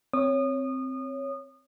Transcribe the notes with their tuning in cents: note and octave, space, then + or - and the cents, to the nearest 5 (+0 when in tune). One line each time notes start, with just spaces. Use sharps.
C4 +0 C#5 +0 D#6 -30